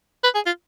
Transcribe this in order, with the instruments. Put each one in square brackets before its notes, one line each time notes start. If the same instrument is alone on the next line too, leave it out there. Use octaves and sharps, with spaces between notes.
[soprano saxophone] B4
G#4
F4